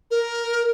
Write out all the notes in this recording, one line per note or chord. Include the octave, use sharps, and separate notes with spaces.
A#4